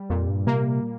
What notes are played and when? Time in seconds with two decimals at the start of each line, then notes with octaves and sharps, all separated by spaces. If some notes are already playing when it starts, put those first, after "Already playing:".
Already playing: G3
0.10 F2 A#2
0.29 G2
0.47 C3 A#3